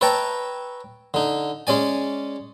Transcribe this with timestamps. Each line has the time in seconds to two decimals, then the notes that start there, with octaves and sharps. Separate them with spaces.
0.01 B4 C#5 E5 G5 A5 A#5
1.14 D3 D#4
1.67 G#3 C#4 D5 G#5